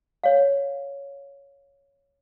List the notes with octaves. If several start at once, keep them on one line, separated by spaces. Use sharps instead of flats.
C#5 F5